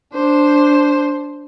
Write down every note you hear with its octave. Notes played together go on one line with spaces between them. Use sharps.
D4 C5